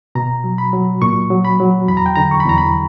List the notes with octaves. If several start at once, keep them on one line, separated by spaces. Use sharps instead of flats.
B2 A#5
F#3
B5
F#3
A#2 C#6
F#3
B5
F#3
E2 B5
A#5
G5
D3 A#5
C#6
B5
E2 A#5
B5